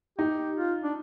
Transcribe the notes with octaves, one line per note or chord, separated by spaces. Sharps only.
D#4 G4
F4
D4